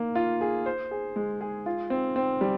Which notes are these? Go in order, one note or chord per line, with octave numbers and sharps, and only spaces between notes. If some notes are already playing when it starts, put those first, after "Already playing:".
Already playing: A#3
F4
G#4
C5
G#4
G#3
G#4
F4
C4
C4
G3